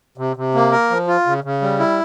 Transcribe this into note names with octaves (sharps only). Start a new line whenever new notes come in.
C3
C3
A#3
A#4
F3
F4
C#3
C#3
G3
E4